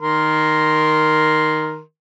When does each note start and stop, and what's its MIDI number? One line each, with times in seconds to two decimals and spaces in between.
0.01 1.80 51
0.01 1.80 70
0.01 1.80 84